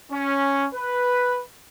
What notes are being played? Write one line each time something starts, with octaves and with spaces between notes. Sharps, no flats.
C#4
B4